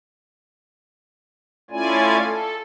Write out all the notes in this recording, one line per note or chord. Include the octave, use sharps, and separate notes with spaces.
A3 C#4 E4 F4 D5 G#5
A4